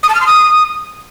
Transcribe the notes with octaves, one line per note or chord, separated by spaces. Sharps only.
D#6
A5
F6
C6
D#6